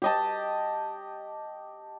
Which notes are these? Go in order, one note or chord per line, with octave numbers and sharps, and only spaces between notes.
G4 D#5 A5